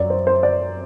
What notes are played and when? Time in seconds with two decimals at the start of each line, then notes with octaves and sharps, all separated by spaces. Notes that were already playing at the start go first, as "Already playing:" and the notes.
Already playing: F#2 F#3 D5
0.10 C5
0.27 C5
0.43 D5